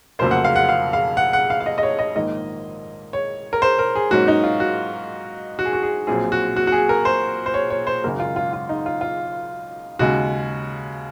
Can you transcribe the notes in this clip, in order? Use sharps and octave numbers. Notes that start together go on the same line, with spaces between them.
F1 F2 C#3 F#3 A#3 C5
F#5
F5
F#5
F5
F5
F#5
F#5
F5
F5
D#5
D#5
C#5
D#5
A#1 G#2 D#3 A#3 D#5
C#5
A#4
C5
A#4
G#4
G#2 F#3 A#3 C#4 F#4
D#4
F4
F#4
F#4
G#4
F#4
G#4
A#1 A#2 F#3 C4 G#4
F#4
F#4
F#4
G#4
A#4
C5
C5
C#5
C#5
C5
G#1 F#2 C#3 G#3 A#4
F4
F4
F4
D#4
F4
F4
D#2 C#3 G#3 F#4